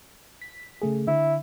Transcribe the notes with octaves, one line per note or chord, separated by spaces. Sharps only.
B6
C#3 A3 G#4
D3 E4